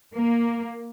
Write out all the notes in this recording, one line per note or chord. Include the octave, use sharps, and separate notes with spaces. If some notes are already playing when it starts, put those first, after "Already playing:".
A#3